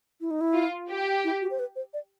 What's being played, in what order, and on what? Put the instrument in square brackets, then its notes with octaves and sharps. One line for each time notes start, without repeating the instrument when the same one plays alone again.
[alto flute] E4
D#4
E4
[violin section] F4
G4
[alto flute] E4
F#4
C5
B4
C5
D5